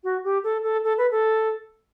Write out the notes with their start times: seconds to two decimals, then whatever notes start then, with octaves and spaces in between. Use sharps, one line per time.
0.04 F#4
0.24 G4
0.44 A4
0.63 A4
0.84 A4
0.98 B4
1.11 A4